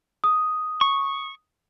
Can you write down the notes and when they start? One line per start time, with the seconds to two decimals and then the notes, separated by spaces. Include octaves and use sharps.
0.24 D#6
0.81 C#6